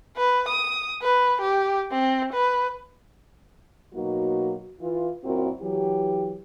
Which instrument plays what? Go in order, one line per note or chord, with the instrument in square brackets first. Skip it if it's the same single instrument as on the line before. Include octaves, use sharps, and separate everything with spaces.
[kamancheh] B4
D#6
B4
G4
C4
B4
[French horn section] B2 F#3 A#3 D#4 F#4
E3 F4
F#2 A#2 C4 E4 F#4 A#4
E3 F#3 G4